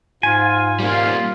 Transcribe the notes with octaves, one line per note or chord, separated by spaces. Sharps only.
G#2 F4 G#5
G3 A#3 F4